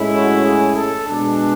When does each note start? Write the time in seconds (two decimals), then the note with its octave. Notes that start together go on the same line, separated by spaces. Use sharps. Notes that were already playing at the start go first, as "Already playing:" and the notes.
Already playing: A2 G#3 C#4 E4
0.11 F#4
0.43 G#4
0.74 A4
1.06 B2 G#3 D4